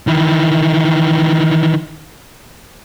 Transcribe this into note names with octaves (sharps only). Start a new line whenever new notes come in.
D#3 E3